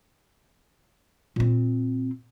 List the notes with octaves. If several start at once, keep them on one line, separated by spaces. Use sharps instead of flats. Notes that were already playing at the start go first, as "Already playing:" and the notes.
A#2 C4